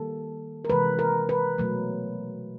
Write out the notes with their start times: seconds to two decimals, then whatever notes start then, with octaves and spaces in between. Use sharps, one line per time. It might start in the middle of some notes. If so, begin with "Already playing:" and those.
Already playing: D#3 G3 A#3 A4
0.65 A#4
0.69 C3 E3 G#3 B4
0.99 A#4
1.29 B4
1.58 B2 F#3 A3